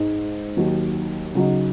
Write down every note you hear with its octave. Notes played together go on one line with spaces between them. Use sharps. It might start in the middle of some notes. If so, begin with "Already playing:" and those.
Already playing: G#2 G#3 D#4
D#2 D#3 F#3
C#3 F#3 D#4